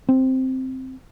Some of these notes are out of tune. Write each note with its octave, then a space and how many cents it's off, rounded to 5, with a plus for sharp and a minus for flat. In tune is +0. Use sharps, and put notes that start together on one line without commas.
C4 +0